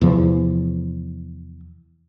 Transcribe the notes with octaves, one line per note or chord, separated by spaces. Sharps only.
E2 C3 F3